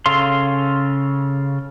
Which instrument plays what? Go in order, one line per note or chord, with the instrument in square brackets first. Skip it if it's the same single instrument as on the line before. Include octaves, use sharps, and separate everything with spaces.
[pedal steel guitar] C#3 A4 F5 C6